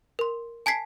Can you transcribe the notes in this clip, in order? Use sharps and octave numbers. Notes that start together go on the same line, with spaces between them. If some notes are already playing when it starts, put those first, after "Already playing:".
A#4 C6
G#5 A5 G#6 B6 C7